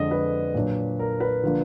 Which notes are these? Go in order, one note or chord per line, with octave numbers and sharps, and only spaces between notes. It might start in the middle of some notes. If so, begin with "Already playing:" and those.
Already playing: F2 D3 G#3 D4 D#5
B4
A#2 F#3 D4
A#4
B4
D3 F3 A#3 D4